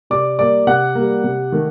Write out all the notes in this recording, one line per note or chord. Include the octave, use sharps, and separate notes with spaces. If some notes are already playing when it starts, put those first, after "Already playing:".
C3 D5 D6
G3 A#3 D5 D6
C3 F#5 F#6
G3 A#3
C3
D#3 A3